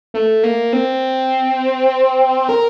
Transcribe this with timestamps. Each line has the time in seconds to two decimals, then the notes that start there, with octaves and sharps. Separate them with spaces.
0.14 A3
0.43 A#3
0.73 C4
2.49 A#4